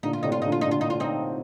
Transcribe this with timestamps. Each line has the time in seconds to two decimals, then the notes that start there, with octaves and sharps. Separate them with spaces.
0.03 A#2 D3 D#4
0.13 F4
0.23 A2 C3 D#4
0.32 F4
0.42 A#2 D3 D#4
0.52 F4
0.61 D#4
0.66 A#2 D3 F4
0.81 D#4
0.90 F4
1.00 C4 D#4